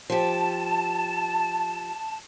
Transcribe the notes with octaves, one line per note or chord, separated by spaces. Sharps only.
F3 G4 A5